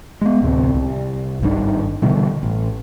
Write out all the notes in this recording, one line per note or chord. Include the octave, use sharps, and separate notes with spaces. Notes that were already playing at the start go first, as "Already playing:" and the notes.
G#3 B3
A1 D2 C3 C4
C2
G#1 G2 D#3 D4
B2 D3 E3 G3
A1